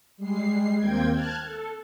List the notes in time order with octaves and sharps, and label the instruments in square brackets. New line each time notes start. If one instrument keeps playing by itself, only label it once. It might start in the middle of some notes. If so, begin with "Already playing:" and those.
[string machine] G3 G#3 C7
D#2 A#3 C4 G5 G#6
A5 F6 F#6 G#6
A4